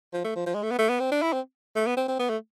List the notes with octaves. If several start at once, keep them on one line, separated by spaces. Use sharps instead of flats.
F3
A3
F3
F3
G#3
A3
B3
A3
B3
C4
D4
E4
C4
A3
B3
C4
C4
B3
A3